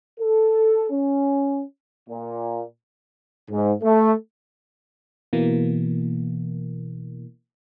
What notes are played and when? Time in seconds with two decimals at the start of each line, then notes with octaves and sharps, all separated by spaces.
0.21 A4
0.91 C#4
2.10 A#2
3.50 G#2
3.83 A3
5.33 B2 E3 A#3